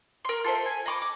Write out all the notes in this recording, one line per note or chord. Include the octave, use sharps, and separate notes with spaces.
A#4 C6
F4 A4 C5 E5
G#5
D#5 B5 C#6 D6
D6